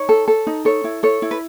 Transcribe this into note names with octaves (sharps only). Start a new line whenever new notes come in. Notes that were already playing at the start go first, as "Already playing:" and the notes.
Already playing: D#4 C#5
A4
A4
D#4
A4 C#5
E4
A4 C#5
E4
B4